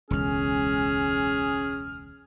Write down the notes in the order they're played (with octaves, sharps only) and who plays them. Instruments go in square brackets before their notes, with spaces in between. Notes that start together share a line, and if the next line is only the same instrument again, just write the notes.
[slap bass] E1 C#2 [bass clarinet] C#4 [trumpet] G#4 [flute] F6